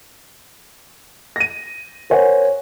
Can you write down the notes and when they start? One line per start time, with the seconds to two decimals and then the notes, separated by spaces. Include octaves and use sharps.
1.36 A#6 D#7
2.10 A#4 C5 C#5 F#5 G#5